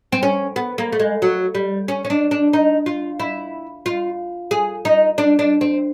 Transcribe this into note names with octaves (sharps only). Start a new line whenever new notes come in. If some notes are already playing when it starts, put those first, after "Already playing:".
C4
C#4
B3
A#3
A3
G#3
F#3
G3
C#4
C#4
D4
D4
D#4
F4
E4
F4
G#4
D#4
D4
D4
C4